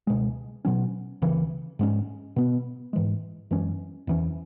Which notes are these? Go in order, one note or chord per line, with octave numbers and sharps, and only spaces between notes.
C#2 B2 G#3
B2 F#3 C#4
C#2 C#3 E3
G#2 G#3 C#4
B2 B3
G#2 E3 G#3
F#2 E3 G#3 C#4
E2 E3 C#4